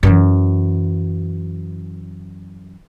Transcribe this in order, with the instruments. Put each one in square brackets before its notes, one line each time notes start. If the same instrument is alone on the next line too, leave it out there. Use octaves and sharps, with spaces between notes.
[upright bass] F#2 E3